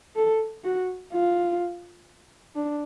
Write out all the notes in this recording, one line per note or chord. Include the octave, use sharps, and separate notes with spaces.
A4
F#4
F4
D4